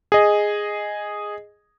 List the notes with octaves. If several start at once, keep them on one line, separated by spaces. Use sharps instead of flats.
G#4 D#5